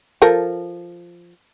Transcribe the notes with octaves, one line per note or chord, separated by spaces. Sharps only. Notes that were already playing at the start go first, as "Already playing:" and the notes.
F3 A4 A#4